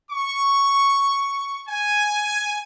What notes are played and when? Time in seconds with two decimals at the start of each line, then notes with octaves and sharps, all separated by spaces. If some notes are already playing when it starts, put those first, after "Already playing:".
0.11 C#6
1.69 G#5